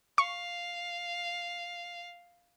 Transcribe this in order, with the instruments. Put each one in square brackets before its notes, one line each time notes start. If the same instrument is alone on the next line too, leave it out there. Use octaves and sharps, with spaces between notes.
[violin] F5 [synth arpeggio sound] C#6